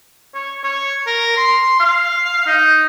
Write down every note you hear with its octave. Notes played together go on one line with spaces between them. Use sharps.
C#5
C#5
A#4
C6
F5
D#4